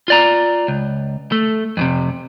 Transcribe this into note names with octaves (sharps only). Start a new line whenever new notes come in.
F4 D5 A#5
C#2
A3
F2 A2 C3